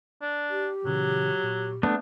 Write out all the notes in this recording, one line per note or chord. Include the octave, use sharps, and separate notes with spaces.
D4
G4
A#2 C#3 E3 F#3
A#2
A3 B3 D4